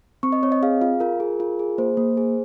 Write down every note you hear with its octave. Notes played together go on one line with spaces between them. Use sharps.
C4 C#6
D#5
C4 C#5
D#5
G#4 F5
F4 F5
F4 A#4
G#4
F4
G#4
A#3 C5
A#3
G#4